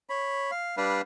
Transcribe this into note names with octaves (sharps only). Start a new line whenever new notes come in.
C#5 B5
F5
G3 D4 B4 F5